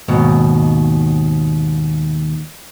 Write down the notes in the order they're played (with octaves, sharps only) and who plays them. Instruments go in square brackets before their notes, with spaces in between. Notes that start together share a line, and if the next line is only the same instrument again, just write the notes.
[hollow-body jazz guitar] D#2 G#2 B2